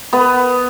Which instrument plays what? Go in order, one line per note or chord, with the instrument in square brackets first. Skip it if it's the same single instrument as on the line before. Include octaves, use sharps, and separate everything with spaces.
[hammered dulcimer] B3